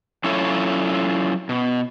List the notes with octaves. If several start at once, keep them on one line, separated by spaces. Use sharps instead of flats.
F#3 C#4 E4 F4 A4 C#5
B2